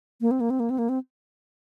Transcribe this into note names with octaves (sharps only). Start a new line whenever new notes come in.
A#3
C4
A#3
C4
A#3
C4
A#3
C4